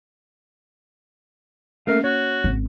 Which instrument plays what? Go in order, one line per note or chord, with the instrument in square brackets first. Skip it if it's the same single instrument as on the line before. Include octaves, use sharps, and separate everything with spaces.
[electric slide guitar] A3 A#4 E5 [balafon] A#3 C#4 [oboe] F5
[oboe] F#4 [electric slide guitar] C#5
[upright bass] G#1